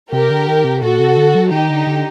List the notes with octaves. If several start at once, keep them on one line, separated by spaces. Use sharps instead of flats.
C3 G4 A#4
D3
D#3
C3
A#2 F#4 A4
C3
D3
F#3
D#3 D#4 G4
D3
D3